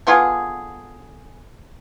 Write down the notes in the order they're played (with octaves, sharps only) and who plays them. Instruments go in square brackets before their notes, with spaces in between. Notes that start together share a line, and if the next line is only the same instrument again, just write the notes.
[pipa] D3 B3 F4 G#4